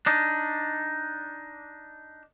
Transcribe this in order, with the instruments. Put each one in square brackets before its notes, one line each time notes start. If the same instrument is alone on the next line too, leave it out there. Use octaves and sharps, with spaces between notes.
[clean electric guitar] D4 D#4